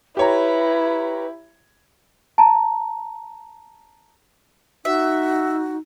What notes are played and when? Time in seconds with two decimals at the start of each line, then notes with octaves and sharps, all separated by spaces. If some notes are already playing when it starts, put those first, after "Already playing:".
0.17 E4 G4 B4 C#5 A#5
2.38 A5 A#5
4.85 D#4 F#4 E5